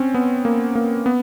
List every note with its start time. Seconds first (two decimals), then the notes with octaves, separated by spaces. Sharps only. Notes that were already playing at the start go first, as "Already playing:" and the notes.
Already playing: C4 C#4
0.14 B3
0.45 A#3
0.75 A#3
1.06 B3